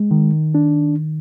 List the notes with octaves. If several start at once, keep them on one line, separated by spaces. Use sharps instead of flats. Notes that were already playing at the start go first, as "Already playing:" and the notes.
Already playing: G#3
D#3
D4